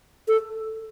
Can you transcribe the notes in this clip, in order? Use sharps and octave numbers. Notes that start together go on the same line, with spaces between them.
A4